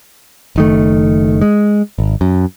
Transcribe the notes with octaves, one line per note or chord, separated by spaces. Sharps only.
F#1 D#3 A3
G#3
G#1
F#2